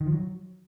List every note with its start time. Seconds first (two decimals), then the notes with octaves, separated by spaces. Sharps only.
0.01 D#3
0.07 F3
0.12 F#3